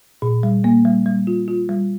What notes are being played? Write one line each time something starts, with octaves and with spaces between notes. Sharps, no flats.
A#2
G3
A#3
G3
G3
F4
F4
G3